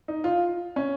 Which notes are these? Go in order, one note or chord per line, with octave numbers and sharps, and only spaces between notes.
D#4
F4
C#4